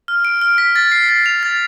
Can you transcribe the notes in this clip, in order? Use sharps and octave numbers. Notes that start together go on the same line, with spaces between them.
F6
D7
F6
B6
A6
C7
A6
F7
A6